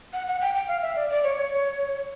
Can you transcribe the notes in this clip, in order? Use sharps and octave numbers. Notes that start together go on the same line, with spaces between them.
F#5
F#5
G5
G5
F5
E5
D5
D5
C#5